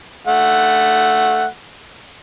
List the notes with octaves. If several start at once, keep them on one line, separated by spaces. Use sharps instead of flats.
A3 F#5